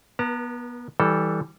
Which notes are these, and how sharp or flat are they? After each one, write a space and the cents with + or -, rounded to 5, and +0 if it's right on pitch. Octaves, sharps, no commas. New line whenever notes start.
B3 -25 A#4 +45 A#5 -45
E3 -15 G3 +0 A4 +0